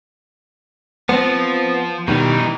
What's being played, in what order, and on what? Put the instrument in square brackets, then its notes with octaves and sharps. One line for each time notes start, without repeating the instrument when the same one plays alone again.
[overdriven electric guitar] F3 [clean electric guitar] B3 C4
[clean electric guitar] B2 D#3 G3 [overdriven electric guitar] E3 D#4